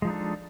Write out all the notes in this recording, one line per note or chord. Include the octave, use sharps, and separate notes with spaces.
F3 G#3 D4 D#4 A4